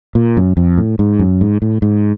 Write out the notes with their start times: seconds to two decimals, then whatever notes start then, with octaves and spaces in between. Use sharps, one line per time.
0.15 A#2
0.37 F#2
0.57 F2
0.78 A2
0.99 G#2
1.19 F#2
1.41 G#2
1.62 A2
1.82 G#2